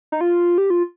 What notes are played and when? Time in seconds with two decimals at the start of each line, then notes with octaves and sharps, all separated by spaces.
0.12 D#4
0.21 F4
0.58 G4
0.70 F4